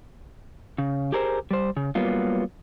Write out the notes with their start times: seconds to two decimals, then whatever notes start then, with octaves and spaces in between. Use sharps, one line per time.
0.78 C#3
1.12 G4 G#4 A#4 C5
1.51 G3 C5
1.77 C#3
1.95 F#3 G3 A#3 B3 F4